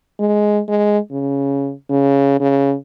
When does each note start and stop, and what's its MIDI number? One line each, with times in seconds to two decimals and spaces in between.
0.19 0.61 56
0.68 0.99 56
1.12 1.73 49
1.90 2.39 49
2.40 2.75 49